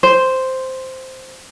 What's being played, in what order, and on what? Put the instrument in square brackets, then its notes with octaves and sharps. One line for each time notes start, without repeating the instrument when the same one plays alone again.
[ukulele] C5